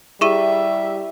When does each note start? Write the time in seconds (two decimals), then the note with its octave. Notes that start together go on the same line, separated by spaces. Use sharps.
0.21 G3 E4 G4 G#4 E5 C#6 D#7